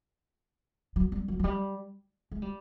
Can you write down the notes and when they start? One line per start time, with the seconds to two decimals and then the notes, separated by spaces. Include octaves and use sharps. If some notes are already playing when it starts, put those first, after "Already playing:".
0.96 F#3
1.12 G3
1.28 F#3
1.39 F#3
1.44 G3
2.31 G#3
2.42 G3